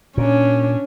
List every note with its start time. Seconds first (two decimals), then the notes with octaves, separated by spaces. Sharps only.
0.18 A#2 C#4 D4